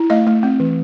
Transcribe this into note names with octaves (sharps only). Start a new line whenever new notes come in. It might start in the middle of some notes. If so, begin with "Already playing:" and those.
Already playing: E4
A3 D#5 F5
A3
C4
E3